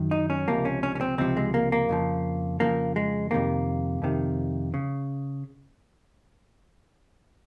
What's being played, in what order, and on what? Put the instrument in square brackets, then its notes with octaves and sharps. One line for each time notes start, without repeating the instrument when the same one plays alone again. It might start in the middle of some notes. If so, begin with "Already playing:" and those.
Already playing: [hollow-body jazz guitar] F#2 D#3
D#4
C#4
C#2 C3 F3 A#3
C#4
C#4
C#4
C4
C#2 C3 F3 C4
G#3
A#3
A#3
F2 C#3 F3
F2 C#3 F3 A#3
G#3
F2 C3 D#3 A#3
F2 C3 D#3
C#3